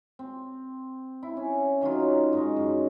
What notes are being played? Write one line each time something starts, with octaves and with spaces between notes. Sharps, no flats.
C4
E4
C#4
D#3 F#3 D#4 F4
G#2 D#5 C#6
F#2